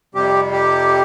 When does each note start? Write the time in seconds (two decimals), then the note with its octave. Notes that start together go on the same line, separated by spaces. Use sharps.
0.15 F2 C3 G3 G4
0.52 G4